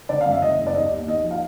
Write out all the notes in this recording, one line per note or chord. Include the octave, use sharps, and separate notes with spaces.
D3 D5
F#2 F5
E5
F#1 D#5
F#1
D5
D#2 D#5
D#2
D#2 D#5
F3
F5